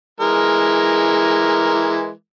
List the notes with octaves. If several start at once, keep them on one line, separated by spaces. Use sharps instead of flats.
E3 G#3 A#4